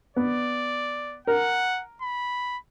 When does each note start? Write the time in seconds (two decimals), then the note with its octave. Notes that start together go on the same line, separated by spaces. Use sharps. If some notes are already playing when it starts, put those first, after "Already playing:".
0.16 B3 D5
1.27 A#4 F#5
2.02 B5